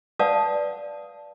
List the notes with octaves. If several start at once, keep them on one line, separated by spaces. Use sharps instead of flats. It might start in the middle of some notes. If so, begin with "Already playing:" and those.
B4 D5 F5 F#5 A5 D#6